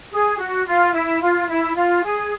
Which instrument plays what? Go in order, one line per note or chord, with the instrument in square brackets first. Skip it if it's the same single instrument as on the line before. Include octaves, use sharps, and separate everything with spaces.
[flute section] G#4
F#4
F4
E4
F4
E4
F4
G#4